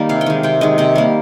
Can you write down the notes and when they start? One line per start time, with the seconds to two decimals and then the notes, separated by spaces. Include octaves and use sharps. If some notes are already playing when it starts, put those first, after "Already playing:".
Already playing: D#3 G3 A#3
0.09 C3 F5
0.21 G5
0.26 D#3 G#3
0.43 C3 G5
0.61 D#3 G#3 D#5
0.78 C3 G5
0.95 G3 A#3